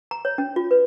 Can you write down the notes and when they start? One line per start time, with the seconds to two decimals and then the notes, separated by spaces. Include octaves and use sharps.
0.11 A#5
0.25 C#5
0.38 C#4
0.56 F4
0.71 B4